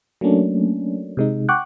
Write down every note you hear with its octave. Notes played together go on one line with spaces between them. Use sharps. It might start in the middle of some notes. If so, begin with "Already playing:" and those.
F#3 A3 A#3 C#4 D4
C3 G#3 D#4
F#5 G5 C#6 D6 F#6